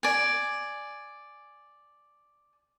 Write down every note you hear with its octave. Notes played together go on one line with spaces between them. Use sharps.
D5 G#5